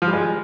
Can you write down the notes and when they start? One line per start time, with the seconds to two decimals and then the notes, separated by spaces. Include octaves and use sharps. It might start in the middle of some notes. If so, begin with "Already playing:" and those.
0.02 F3
0.07 G3
0.13 G#3